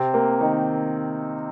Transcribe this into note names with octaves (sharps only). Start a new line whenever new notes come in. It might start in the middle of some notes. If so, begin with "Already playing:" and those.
Already playing: C3 C4
A#3
D#3 D#4